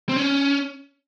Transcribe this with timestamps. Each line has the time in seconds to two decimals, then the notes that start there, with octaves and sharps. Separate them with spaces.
0.09 C4
0.16 C#4